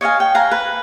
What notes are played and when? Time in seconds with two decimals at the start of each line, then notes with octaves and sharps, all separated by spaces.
0.01 C#5 D#5 F5 G#5
0.20 G5
0.34 F5 F#5 G#5 A#5
0.51 B4